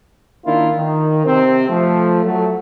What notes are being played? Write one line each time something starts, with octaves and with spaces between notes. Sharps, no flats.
D#3 A#3 D4 E4 F4
D#3
C3 C4
F3 A3
F#3 A3